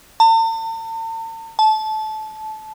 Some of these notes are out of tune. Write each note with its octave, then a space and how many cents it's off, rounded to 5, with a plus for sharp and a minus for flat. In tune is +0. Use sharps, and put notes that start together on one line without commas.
A5 +45
A5 -20